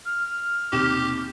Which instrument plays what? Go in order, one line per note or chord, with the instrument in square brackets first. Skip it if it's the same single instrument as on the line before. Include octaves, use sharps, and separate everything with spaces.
[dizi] F6
[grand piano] D#2 C3 E7 [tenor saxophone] G4